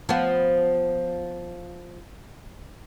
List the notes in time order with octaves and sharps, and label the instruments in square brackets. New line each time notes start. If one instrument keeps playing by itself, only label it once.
[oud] F3 B3